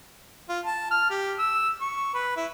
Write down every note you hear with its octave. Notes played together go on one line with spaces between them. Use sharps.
F4
A5
F6
G4
E6
C#6
B4
E4